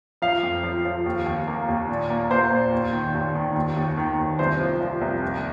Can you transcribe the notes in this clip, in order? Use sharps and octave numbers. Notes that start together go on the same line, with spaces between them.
F3 F5
F2
F3
F3
D#2
D#2
A#3
D#2
A#2
A#3
A#3 C5
A#2
D#2
D#3
D#2
D#3
D#2
D#2
D#3
D#2
C2 C5
F3
F3
C2
D#2